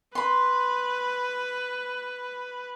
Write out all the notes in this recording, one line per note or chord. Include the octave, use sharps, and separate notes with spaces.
B4 B5 C6